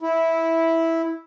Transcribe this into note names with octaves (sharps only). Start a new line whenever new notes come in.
E4